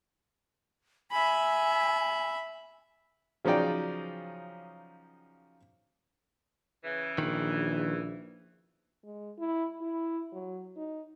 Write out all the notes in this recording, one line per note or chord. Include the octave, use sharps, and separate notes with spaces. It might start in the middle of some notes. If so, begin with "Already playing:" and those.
E5 G#5 B5
C#3 F3 F#3 D#4 D5 G5
C#3 E3
A#1 D#3
G#3
E4
E4
F#3
D#4